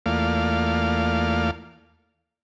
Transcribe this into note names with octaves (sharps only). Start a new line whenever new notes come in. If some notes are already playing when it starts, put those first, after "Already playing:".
E2 A3 A#3 F4 D5 F5